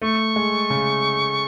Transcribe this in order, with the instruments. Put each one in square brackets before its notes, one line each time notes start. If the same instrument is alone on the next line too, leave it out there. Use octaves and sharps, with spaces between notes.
[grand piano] A3 [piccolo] C#6
[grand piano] G#3
C#3